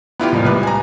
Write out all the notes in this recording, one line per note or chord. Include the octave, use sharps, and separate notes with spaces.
B3 E4 F4 G4
C2 F2 A#2
C2 G#2 B4
G#5 A#5